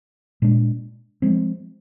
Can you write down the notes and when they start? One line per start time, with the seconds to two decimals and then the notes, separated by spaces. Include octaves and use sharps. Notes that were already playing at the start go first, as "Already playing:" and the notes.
0.42 A#2 G#3 D4
1.22 F3 G#3 C4